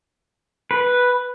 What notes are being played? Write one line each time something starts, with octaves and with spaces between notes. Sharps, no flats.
B4